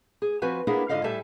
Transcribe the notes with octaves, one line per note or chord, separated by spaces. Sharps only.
G#4
F3 C4 F#4 B4 G#5
A#3 B3 D4 E4 G#4 A#4
G#2 D3 F4 D#5 F5
A2 G3 A4 E5 G#5 A5